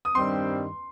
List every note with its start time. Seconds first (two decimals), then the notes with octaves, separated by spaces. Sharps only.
0.05 D#6
0.15 G2 D#3 G3 C4 C6